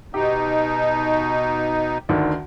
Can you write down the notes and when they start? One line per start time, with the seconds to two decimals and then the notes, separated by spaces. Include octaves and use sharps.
0.14 B2 D#4 G4
2.09 D2 D3 D#3